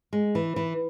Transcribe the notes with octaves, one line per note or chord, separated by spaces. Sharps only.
G#3
E3
E3